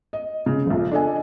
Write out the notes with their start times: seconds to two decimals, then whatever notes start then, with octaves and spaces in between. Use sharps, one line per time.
0.13 D#5
0.46 C#3
0.66 F1 A#1
0.92 D4 A4 D#5 G#5